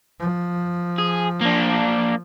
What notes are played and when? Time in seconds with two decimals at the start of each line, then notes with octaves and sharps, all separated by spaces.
0.20 F3
0.98 G#4
1.41 A#3 D4